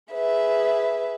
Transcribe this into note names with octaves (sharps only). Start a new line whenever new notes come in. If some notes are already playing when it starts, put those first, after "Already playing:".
G#4 B4 E5